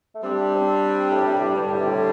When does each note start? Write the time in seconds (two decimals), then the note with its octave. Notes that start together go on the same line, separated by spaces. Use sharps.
0.15 A3
0.22 G3 C4 D4 G4
0.55 C4
1.10 A2
1.22 C3
1.34 A2
1.44 G2
1.55 G2 D3 G3 D4 G4 C5
1.72 A2
1.79 C3
1.86 A2